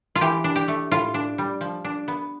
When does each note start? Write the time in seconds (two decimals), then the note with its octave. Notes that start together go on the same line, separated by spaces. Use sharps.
0.15 F4
0.21 E3 G4
0.44 D4
0.56 G4
0.68 A3
0.91 A2 F4
1.14 D4
1.38 G3
1.61 F3
1.85 D4
2.08 B3